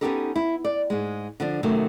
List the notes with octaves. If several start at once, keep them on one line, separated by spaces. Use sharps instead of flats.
B3 C#4 D#4 G4 A4 A#4
E4
D5
G#2 G#3
D3 F3 D4
F#2 C3 D#3 A3 F#4